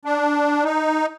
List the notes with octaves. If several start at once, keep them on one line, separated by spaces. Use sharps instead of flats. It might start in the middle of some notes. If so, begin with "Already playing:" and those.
D4
D#4